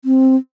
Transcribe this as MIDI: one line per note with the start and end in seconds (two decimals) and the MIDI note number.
0.05 0.36 60